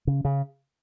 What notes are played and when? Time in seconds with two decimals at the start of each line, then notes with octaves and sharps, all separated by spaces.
0.07 C#3
0.25 C#3